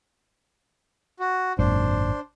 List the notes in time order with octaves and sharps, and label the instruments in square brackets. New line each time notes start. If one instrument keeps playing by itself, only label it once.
[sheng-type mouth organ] F#4
[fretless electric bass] G#1 F#2 A#2 [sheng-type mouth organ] D4 C5